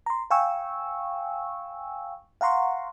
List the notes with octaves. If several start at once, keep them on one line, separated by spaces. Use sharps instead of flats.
A#5 C6
F5 G5 G#5 C#6 E6
F5 F#5 A#5 C6 C#6